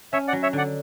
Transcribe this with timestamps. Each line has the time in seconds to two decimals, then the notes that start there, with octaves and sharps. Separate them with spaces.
0.13 C#4 C#5 E5
0.28 D5 F#5
0.33 F#3
0.43 C#5 E5
0.53 D3 D5 F#5